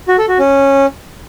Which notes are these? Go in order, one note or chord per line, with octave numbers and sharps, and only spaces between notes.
F#4
A4
F#4
C#4